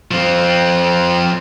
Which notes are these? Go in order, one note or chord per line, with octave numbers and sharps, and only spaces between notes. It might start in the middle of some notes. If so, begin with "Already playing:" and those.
F3 C4